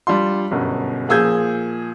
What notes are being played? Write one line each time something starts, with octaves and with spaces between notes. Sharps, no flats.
G3 D4 F4 C6
G1 F#2 B2
A#2 F3 G#4 E6 G6 G#6